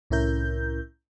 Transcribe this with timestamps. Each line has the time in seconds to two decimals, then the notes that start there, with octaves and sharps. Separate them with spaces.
0.10 C2 A2 C#4 E4 A#4 G6